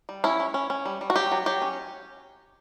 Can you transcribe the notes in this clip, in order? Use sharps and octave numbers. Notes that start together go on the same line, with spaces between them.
G3
C#4 E4
C#4
C#4
C#4
G3
G3
F#4
F#3 G4
F#3
F#3 G4
C#4